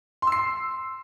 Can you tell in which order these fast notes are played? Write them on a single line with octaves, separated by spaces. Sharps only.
C6 E6 C7